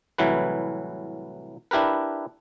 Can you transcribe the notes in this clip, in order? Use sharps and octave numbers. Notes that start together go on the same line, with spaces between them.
C2 A2 E3 F#3 B4
D4 E4 G4 A#4 B4